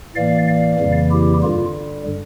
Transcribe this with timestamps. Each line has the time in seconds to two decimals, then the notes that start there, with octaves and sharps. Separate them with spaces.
0.16 A2 E3 A#3 D5 F5
0.47 D5 F5
0.79 F2 C#3 E3 G3 A#3
1.11 E4 G4
1.42 G2 D3 G3 F4